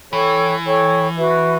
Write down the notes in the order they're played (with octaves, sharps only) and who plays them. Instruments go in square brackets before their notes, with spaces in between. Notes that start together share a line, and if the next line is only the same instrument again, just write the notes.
[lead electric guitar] E3 [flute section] A4 C#5 G5 C#6
[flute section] A4 C#5 G5 C#6
F#4 B4 E5